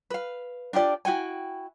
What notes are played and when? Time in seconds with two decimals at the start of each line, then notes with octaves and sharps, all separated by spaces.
0.10 B4 F5
0.73 D4 F4 G4 D5
1.05 E4 F#4 G5 G#5